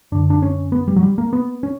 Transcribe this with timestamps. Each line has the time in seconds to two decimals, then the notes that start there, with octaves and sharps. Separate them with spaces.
0.12 F#2 D3 D4
0.30 D4
0.42 C#4
0.72 B3
0.88 G3
0.96 F#3
1.03 G3
1.18 A#3
1.33 B3
1.63 C#4